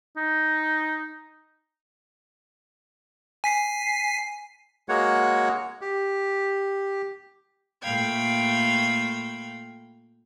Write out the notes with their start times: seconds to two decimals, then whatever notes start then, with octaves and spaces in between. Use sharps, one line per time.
0.17 D#4
3.44 G#5 B6 C7
4.89 G#3 A#3 F#4 C#5 F#5
5.81 G4
7.82 A#2 A3 F5 G5 B5 G#6